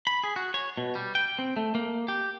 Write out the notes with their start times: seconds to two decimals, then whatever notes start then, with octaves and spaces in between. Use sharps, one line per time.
0.07 B5
0.24 G#4
0.36 F#4
0.54 C#5
0.78 B2
0.95 G3
1.15 G5
1.39 C4
1.56 A3
1.75 A#3
2.08 G4